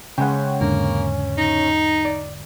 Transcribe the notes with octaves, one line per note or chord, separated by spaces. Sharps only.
C#3 G#3 C#4 C5 F#5 G5
E2 G#2 D3 A#3
D#4
D5